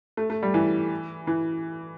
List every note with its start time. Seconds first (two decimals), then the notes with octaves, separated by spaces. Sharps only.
0.17 A3
0.30 A3
0.43 G3
0.54 E3
1.27 E3